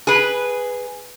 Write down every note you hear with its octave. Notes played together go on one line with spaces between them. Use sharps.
G#4 B4